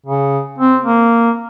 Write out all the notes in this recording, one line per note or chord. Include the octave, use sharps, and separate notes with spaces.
C#3
C4
A#3